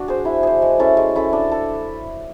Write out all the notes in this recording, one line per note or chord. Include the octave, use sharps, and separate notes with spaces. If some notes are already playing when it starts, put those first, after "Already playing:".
Already playing: D4 F#4
G#4 C5
E4
G#4 C5
G#3
C#4 E4 A4
G#3
C#4 E4 A4
D4
A4